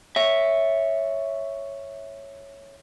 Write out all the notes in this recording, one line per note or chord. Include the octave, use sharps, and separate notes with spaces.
C#5 E5